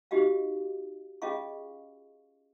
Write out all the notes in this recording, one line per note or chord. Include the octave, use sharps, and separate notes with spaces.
D#4 F#4 G4 D#5 F5
C#4 F4 G#4 D#5 F5 C#6